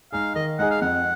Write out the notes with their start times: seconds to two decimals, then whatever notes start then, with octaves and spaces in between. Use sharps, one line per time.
0.12 G#3 D#4 G#4 F5
0.36 D#3 D#5
0.58 G#3 D#4 G#4 F#5
0.70 F5
0.81 F2 F#5